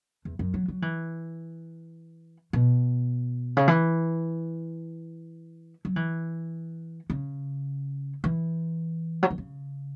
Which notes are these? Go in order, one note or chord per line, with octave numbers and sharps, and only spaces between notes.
E2
F#2
F#3
F#3
E3
B2
C#3
E3
F#3
E3
C#3
E3
F#3
E3
C#3